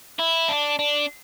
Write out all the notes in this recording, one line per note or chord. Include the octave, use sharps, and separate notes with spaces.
E4
D4
D4